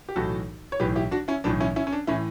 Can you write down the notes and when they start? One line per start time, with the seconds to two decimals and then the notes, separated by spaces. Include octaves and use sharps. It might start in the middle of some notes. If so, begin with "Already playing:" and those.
0.09 G4
0.16 B1 A2 E3 F#4 A4
0.72 C#5
0.80 B1 A2 E3 G4 B4
0.96 E4 G4
1.11 D4 F#4
1.28 C#4 E4
1.44 B1 A2 E3 D4
1.60 C#4 E4
1.76 C#4 E4
1.87 C#4
1.93 D4
2.07 A2 E3 C#4 E4